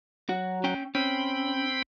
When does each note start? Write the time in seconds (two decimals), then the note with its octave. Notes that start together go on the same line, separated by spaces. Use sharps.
0.29 F#3 F#4
0.64 C#4 G5
0.95 C4 C#4 G5 B5